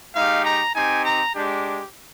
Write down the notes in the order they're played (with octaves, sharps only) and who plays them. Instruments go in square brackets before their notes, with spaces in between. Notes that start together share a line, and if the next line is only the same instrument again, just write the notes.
[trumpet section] G#3 D#4 G4 F5
A#5
C4 D#4 G4 G#5
A#5
G#3 D4 G4